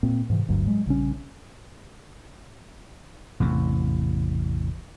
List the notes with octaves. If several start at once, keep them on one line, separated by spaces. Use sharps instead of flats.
A#2 A#3 C4
G#2 C3 E3
G1 D2 G2 F#3
A2 F#3 G#3
A#1 C#3 G3 C#4
A1 E2 C3